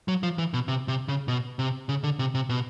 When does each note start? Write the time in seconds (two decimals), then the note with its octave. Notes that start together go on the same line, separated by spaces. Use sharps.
0.08 F#3
0.23 F3
0.38 E3
0.54 B2
0.68 C3
0.88 C3
1.08 C#3
1.28 B2
1.59 C3
1.89 C#3
2.04 D3
2.19 C3
2.35 C3
2.49 B2